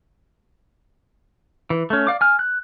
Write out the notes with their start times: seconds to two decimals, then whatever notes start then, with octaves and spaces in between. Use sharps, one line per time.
1.70 E3
1.90 A3 C#4
2.07 D5 F5 D6
2.21 G#5 F6
2.39 F#6